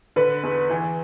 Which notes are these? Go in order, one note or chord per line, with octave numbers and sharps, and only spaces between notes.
D3 B4
E2
E3